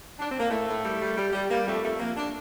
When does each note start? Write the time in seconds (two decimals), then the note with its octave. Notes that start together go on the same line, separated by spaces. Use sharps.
0.19 D4
0.29 C4
0.40 A#3
0.50 A2 A3
0.67 A2
0.83 G3
1.00 G3
1.17 G3
1.33 G3
1.50 G3 A#3
1.67 F2 A3
1.83 F2 A3
1.99 F2 A#3
2.17 D4